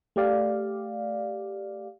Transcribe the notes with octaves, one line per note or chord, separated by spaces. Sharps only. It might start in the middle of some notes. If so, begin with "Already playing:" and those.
A3 G4 D5 F5